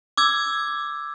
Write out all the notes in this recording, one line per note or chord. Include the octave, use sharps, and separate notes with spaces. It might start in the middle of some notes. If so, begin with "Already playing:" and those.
D6 E6 G#6